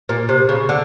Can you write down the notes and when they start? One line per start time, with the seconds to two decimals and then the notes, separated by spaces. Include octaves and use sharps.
0.09 A#2
0.29 C3
0.49 C#3
0.69 D3